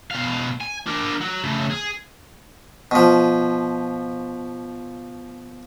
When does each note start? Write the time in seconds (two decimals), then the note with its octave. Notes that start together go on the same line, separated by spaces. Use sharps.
0.11 B2 F5
0.61 G#5
0.87 D4 A#4
1.21 F#3
1.44 C#3 A3
1.70 G#4
2.91 B2 F3